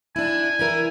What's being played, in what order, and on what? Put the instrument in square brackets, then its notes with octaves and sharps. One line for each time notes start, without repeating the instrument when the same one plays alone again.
[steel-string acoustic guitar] D4 E4 [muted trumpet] G#5
[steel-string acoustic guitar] E3 E4 A#4